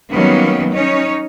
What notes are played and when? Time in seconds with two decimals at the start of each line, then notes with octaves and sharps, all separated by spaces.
0.11 D#3 F#3 G3 A#3 B3 C#4
0.74 C#4 D#4 C#5